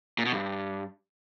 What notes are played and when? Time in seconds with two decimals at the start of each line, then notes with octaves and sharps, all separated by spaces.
0.18 A#2
0.25 B2
0.32 G2